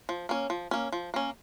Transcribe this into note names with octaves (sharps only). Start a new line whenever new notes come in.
F3
A#3 C#4
F3
A#3 C#4
F3
A#3 C#4